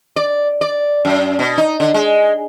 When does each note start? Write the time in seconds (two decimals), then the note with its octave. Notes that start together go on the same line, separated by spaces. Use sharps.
0.16 D5
0.61 D5
1.05 F#2
1.39 B2
1.58 D#4
1.80 D3
1.94 G#3